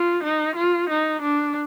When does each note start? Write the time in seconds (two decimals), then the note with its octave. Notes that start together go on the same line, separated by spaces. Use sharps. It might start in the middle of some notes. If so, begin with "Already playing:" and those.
Already playing: F4
0.23 D#4
0.56 F4
0.90 D#4
1.22 D4